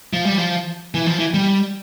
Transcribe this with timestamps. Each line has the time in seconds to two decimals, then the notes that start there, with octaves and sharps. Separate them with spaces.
0.13 F3
0.25 G3
0.38 F3
0.94 E3
1.06 F3
1.19 E3
1.34 G3